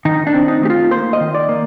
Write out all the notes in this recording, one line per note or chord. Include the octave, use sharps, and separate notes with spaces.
D#3 D#4
D4
C4
D#4
A3 G4
F4
A#3 C5
D#5
D#3
D5
A#3